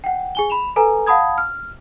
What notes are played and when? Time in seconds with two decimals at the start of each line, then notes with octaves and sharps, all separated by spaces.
0.04 F#5 G5
0.35 G#4 G#5 G7
0.50 B5 E7 F7
0.76 A4 B4 G#5 A#5
1.07 F5 F#5 A5 B5 D#6 G#6
1.38 F6